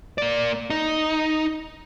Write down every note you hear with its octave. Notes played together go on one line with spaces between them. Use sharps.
A#3 D5
D#4